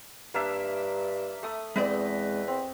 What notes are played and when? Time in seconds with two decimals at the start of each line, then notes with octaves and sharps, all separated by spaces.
0.34 G2 A#3 D4 E5
1.43 A3 D#6
1.76 E2 G#3 C4 B4 D5 D#5
2.48 C4